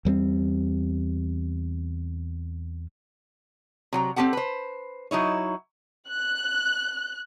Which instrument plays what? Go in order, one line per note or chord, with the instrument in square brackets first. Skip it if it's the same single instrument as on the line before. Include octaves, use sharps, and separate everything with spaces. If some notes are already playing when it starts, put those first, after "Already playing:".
[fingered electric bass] E2 G3 G#3 C4
[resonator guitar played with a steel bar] C3 F#3 A#5
C4 F4 G4 A4 F#5
B4 C5
F#3 D#4 E4 C#5
[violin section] F#6